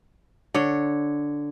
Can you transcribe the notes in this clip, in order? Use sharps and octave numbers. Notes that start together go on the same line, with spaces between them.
D3 C#5